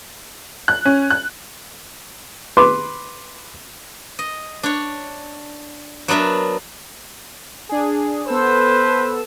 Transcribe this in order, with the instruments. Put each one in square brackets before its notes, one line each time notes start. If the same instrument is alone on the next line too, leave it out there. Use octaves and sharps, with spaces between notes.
[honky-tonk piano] F#6
C#4
F#6
[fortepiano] B4 C6 D6
[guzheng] D#5
D4 C#5
F#3 B3 D4 A#4 E5
[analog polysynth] D4 G#4
[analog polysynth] B3 A4 E6 [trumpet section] B4 C5